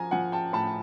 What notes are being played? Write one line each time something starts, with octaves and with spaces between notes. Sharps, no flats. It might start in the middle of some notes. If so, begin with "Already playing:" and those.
Already playing: F3 G#5 A#5
F3 F#5 G#5
G5 A5
A2 A5 B5